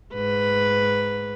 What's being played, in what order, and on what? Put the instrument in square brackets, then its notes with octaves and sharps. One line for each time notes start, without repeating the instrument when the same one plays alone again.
[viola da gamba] G#2 B4